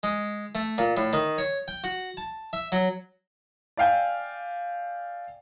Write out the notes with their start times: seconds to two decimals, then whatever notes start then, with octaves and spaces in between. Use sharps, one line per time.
0.03 G#3
0.55 A3
0.78 A#2
0.97 A2
1.13 D#3
1.38 C#5
1.68 G5
1.84 F#4
2.17 A5
2.53 E5
2.72 F#3
3.77 D5 E5 F5 G5 G#5